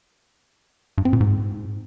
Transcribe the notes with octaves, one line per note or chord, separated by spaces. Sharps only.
G2
C4
A#2
G#2